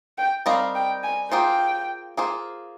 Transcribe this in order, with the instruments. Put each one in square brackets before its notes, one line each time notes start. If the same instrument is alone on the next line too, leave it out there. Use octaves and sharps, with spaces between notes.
[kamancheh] G5
[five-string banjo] G3 C4 D#4 A#4 D#5 [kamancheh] F5
[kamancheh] G5
G#5
[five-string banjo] A#3 F4 G#4 C5 [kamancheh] G5
[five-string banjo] A#3 F4 G#4 C5